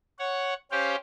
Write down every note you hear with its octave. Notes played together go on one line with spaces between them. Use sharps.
C#5 F#5
C#4 G4 C5 F5 G5